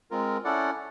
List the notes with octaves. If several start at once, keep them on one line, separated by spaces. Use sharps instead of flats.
G#3 C4 F4 A#4
C#4 E4 A4 D5 F#5